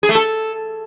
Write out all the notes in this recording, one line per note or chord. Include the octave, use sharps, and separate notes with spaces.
G#4
A3
A4